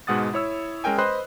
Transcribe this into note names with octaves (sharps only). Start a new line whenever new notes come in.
G#2 B2 G#3 F#5 D#6 A6
E4 C#5 E6
G#3 C#4 A#4 G5 G#5
B4 C5 D#5 B5 C6 F#6